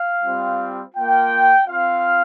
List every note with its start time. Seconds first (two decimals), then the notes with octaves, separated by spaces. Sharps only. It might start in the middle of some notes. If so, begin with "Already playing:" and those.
Already playing: F5
0.22 G3 C4 F4
0.95 A#3 F4 G5
1.68 C4 F4 F5